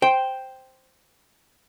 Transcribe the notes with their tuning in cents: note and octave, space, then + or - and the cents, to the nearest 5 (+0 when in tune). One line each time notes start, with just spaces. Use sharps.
C5 +0 G5 +0